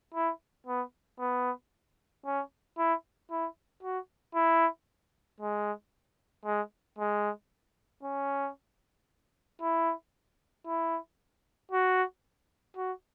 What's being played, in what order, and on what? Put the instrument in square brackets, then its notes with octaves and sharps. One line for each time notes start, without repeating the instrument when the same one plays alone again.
[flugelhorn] E4
B3
B3
C#4
E4
E4
F#4
E4
G#3
G#3
G#3
C#4
E4
E4
F#4
F#4